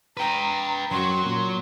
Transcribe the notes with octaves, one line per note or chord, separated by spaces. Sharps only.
B4 G5 A#5
F#2 F#3 F#4 C6
A#2